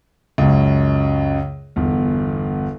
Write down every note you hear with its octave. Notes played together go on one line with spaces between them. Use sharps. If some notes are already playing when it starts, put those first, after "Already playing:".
C#2 F#2
G1 E2